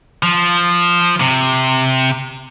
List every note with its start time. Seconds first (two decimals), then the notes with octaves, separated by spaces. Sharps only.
0.23 F3
1.20 C3